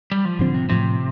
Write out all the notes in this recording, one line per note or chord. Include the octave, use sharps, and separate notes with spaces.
G3
F3
A2 D3 F3 C4
C3
A2 C3 F3 C4